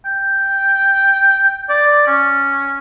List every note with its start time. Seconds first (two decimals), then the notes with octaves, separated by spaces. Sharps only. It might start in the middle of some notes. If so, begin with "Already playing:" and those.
0.05 G5
1.70 D5
2.07 C#4